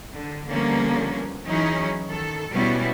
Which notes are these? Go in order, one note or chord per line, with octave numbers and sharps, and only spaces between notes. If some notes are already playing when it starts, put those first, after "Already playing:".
D3
D3 F3 G3 A#3 B3 C#4
E3 F#3 C#4 D#4 E4 G#4
D#3 A4
B2 G3 B3 C#4 E4 F#4